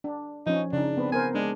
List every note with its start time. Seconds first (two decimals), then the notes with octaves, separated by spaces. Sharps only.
0.04 D4
0.47 F3 C#4 D#4
0.73 C#3 D4 D#4
0.97 B3 C4 B4
1.12 B3 A#4 C5 G#5
1.35 G#3 D4